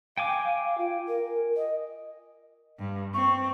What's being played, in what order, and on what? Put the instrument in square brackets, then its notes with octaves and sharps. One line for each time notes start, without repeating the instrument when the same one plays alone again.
[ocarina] F5 [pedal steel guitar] G5 G#5 D6
[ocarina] F4
A#4
D#5
[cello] G2
[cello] C4 [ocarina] C#6